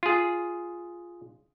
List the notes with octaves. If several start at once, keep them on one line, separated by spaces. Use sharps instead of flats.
F4 G#4